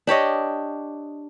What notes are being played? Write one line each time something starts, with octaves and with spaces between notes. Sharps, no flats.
D4 G4 C#5 D#5